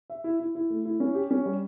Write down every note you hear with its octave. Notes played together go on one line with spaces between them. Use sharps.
E5
E4
E4
E4
A3
E4
C#4
G4
C#4
G3